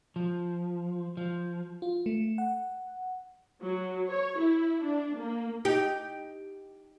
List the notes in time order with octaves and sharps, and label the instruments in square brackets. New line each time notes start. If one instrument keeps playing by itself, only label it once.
[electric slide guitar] F3
F3
[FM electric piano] F4
A3
F#5
[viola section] F#3
C#5
E4
D4
A#3
[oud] D#4 G4